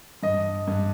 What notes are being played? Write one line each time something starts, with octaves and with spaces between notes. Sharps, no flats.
G2 D#5
G2